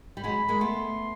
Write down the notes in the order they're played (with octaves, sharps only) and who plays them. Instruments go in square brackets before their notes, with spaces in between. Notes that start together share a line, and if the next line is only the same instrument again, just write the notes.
[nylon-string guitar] G3
[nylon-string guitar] F#3 G#3 [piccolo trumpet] B5
[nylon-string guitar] G#3 A#3
[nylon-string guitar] A3 B3 [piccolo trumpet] C6